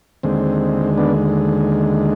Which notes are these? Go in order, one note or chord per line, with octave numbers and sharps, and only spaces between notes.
D#2 D3 G#3 C4
B3 D4